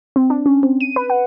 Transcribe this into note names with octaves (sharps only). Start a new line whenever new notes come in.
C4
D4
C#4
C4
D#7
B4
F#5